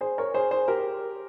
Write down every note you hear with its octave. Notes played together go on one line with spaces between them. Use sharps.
G#4 C5
A#4 C#5
G#4 C5
G#4 C5
G4 A#4